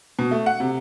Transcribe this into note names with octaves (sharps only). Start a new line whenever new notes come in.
B2
A3
F#5
C3